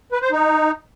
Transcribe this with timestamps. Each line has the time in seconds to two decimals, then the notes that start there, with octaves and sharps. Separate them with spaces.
0.12 B4
0.22 C5
0.32 D#4